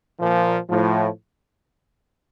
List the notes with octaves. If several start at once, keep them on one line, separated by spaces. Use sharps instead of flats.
A#2 F3
A2 F3